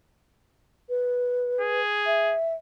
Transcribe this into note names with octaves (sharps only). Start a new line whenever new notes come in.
B4
G#4
E5